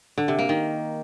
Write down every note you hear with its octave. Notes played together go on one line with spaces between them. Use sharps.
D3
C3
A#3
D#3